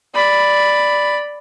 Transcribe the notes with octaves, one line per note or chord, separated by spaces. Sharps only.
D5 B5